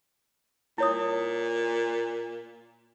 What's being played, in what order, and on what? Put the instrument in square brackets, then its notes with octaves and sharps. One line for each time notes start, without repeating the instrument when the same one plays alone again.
[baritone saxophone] A#2 [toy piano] E4 C#5 D#6